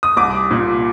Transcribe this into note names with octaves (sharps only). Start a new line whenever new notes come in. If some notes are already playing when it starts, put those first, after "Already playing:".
D#6
C2 D6
A#2